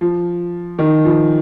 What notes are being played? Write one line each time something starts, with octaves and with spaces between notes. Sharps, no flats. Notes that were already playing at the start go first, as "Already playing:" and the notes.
F3
D#3
F3